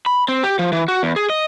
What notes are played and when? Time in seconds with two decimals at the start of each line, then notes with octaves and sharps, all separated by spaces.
0.06 B5
0.28 C4
0.44 G4
0.59 F3
0.72 E3
0.88 F#4
1.03 E2
1.16 G#4
1.30 D#5